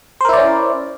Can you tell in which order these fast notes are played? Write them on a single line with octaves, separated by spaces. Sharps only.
C5 A#4 E4 D5 C#4